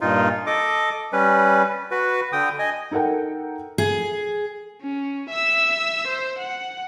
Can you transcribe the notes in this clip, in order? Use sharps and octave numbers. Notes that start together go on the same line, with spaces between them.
G2 A#2 D#4 F4
A4 D#5 D6
G3 C#4 B4
F#4 B4
D3 G5 D#6
D#5 G#5
D#4 A4 A#4 F#5 G5
G#4
C#4
E5 E6
C5
F#5